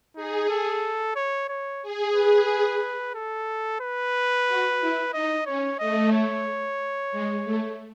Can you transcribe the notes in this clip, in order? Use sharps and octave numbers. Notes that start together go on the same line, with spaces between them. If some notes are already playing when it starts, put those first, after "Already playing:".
D#4 G#4
A4
C#5
C#5
G#4
B4
A4
B4
F#4
E4
D#4 D#5
C#4 C#5
A3 D#5
C#5
G#3
A3